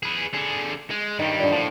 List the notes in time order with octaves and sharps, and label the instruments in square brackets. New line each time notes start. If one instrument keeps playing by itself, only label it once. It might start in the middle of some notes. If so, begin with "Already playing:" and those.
[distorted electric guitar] G#4 B4
D3 G#4
G#3
[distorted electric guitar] G2 G3 [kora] D#3 C#5
[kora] A#2 D3
[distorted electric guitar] A2 [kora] F3 F5 G5